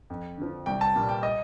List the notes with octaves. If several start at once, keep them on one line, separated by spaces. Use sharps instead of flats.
F2
D3 F3
C2 G5
A5
A#2 G3
G5
D#5